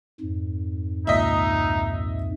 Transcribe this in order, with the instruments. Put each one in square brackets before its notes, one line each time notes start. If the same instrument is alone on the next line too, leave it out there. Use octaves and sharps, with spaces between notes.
[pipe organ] F2 G#2
[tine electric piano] C#2 A#2 B6 [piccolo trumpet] D#4 [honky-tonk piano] D#5 E5